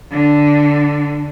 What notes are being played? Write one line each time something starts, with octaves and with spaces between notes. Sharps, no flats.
D3